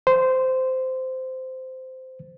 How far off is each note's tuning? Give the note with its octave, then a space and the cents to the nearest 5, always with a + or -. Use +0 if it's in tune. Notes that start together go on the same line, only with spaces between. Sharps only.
C5 -15